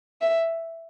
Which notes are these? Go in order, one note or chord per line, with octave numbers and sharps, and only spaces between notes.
E5